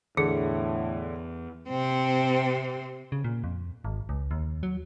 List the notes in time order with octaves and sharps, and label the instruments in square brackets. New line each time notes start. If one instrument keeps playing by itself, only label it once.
[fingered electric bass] E2 E3 [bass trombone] A2 [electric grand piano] D3 [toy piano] G#4
[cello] C3 C4
[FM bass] C#3
A#2
F2
G#1
C#2
D#2
F#3